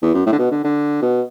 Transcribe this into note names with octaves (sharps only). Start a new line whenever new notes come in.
E2
F#2
A2
D3
B2
D3
D3
B2